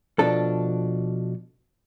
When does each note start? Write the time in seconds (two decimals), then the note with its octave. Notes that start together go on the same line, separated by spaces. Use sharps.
0.19 B2 F3 D4 A4